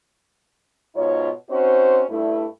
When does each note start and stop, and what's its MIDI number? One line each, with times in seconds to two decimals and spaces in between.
0.96 1.32 44
0.96 1.32 47
0.96 1.32 63
0.96 1.32 65
0.96 1.32 73
1.51 2.05 60
1.51 2.05 61
1.51 2.05 63
1.51 2.05 66
1.51 2.05 72
2.10 2.47 43
2.10 2.47 57
2.10 2.47 64